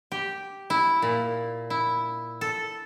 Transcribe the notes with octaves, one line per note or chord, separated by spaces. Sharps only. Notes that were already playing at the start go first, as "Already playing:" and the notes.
G4
E4
A#2
E4
A4